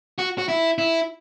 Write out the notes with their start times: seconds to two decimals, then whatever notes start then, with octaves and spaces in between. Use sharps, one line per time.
0.19 F#4
0.38 F#4
0.49 E4
0.78 E4